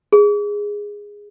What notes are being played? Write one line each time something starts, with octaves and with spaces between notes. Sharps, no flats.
G#4